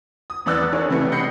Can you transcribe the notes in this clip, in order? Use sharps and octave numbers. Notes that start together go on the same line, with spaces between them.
D#6
E2 E3 D5 E6 F#6 A6
D4 G#4 A#4 C#5 D5
C#2 C3 E3 G3 A3
D#5 F#5 B5 G6 C7 C#7